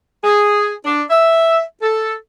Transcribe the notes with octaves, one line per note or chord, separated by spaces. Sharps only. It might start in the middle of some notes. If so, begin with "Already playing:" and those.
G#4
D4
E5
A4